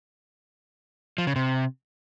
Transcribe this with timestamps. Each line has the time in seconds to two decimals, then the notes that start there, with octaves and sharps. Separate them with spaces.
1.18 F3
1.27 C#3
1.36 C3